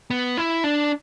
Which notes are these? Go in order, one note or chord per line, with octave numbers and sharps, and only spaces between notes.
B3
E4
D4